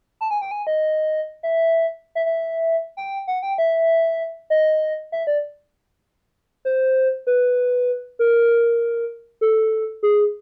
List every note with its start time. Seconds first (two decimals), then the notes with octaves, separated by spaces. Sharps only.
0.21 A5
0.31 G#5
0.42 G5
0.51 G#5
0.67 D#5
1.43 E5
2.15 E5
2.26 E5
2.97 G5
3.28 F#5
3.43 G5
3.58 E5
4.50 D#5
5.12 E5
5.27 D5
6.65 C5
7.27 B4
8.19 A#4
9.41 A4
10.03 G#4